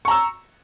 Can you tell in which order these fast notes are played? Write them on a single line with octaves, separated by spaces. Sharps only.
C#6 A#5 E6